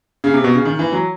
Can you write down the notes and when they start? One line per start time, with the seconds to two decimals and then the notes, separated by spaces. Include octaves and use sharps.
0.24 C#3
0.34 C3
0.44 B2
0.55 C#3
0.65 D#3
0.79 E3
0.92 F#3